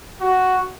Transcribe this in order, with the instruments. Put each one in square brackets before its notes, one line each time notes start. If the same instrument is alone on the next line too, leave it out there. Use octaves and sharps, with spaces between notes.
[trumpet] F#4